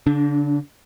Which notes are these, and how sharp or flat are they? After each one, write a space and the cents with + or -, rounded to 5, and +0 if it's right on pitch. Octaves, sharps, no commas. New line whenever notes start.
D3 -40 D4 +0